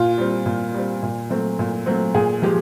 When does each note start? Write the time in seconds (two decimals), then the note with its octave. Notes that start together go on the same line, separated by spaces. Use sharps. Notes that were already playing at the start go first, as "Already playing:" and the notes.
Already playing: A#2 F4
0.18 G3 C4
0.46 A#2
0.74 G3 C4
1.03 A#2
1.30 F#3 A3 C4
1.59 A#2
1.86 F#3 A3 C4
2.14 A#2 G#4
2.42 F3 G#3 G4